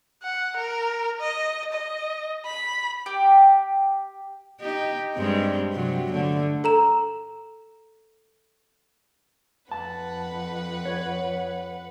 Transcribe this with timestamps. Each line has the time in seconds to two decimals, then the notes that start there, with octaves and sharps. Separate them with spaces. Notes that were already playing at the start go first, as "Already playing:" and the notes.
0.23 F#5
0.57 A#4
1.20 D#5
1.73 D#5
2.46 B5
3.06 G4
4.61 D#4 G4
5.15 G2 G#3 C4
5.73 C3 F#3
6.13 D3 A3
6.64 A4 A#5 E7
9.72 F2 B4 F#5 A5
10.85 C#5